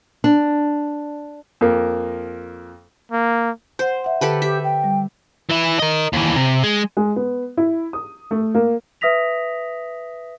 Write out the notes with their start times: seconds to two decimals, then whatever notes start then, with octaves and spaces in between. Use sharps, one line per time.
0.24 D4
1.61 F2 A#3
3.12 A#3
3.79 C5 F#5 G6
4.04 E5 F#5
4.21 D3 G4 A4 B4 A5
4.42 G4 E5
4.64 G5
4.84 G3
5.50 E3 E4
5.79 A#4 D#5
6.13 D#2 E3
6.36 C3
6.64 G#3
6.97 G#3
7.16 B3
7.57 E4
7.93 D#6
8.31 A3
8.55 A#3
9.01 B4 E5 D#6 A#6 B6 F7